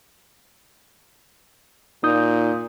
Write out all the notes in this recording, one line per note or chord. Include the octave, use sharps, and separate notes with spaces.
A#2 D#4 D#6 G6